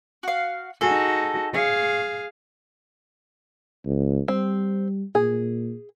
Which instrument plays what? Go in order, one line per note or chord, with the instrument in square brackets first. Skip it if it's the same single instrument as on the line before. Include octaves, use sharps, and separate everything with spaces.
[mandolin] F#4 F5
[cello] D#4 F#4 [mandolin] G#4 A4
[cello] G#4 F5 [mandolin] C#5
[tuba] C#2
[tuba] G3 [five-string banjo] C4
[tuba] A#2 [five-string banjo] G#4